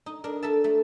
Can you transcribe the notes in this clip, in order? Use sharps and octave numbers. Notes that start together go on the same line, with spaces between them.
D#4
D4 A#4
A4 A#4 E5 A5
A3